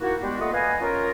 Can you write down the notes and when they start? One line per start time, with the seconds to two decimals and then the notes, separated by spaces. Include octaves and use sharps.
0.01 A#3 D#4 E4 F#4
0.22 G3 G#3 B3 D4 F#4 G4
0.40 A3 A#3 F4 B4 D#5 F#5
0.53 B4 D#5 F5 F#5 G#5
0.81 C#4 F4 A#4